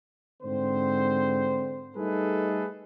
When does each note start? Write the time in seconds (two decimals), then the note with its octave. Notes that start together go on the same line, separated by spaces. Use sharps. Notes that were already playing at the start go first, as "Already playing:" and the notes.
0.42 G#2 D3 C4 C5
1.96 G3 A3 D#4 G#4 A4 B4